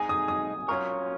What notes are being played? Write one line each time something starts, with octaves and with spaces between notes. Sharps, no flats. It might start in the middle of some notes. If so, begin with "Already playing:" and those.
Already playing: G#3 D#4 G#4 G#5
D#6
D#6
F#3 C#4 F4 A#4 C#6